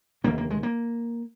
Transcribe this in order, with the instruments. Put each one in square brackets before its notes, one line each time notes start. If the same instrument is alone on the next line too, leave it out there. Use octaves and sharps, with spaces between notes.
[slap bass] F1 D#2 D3 A#3
A#3
G#3
A#3